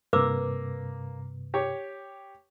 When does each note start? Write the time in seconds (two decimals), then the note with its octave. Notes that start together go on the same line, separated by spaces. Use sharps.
0.13 G2 C3 A#3 B4 D6 E6
1.54 G4 C#5